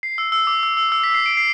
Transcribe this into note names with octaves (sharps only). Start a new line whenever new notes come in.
C7
E6
E6
D6
E6
E6
E6
B6
C7
D7
C7